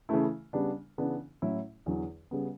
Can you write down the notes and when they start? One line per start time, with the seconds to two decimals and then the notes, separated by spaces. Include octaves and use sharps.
0.09 C#3 E3 A3 E4
0.53 C#3 G3 B3 D4
0.98 C#3 E3 B3 D4
1.42 A2 F#3 C#4 E4
1.86 E2 D3 F#3 B3 E4
2.31 C#3 G3 B3